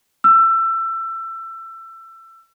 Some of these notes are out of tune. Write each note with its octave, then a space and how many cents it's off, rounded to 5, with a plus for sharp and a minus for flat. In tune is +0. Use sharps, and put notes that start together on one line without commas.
E6 +25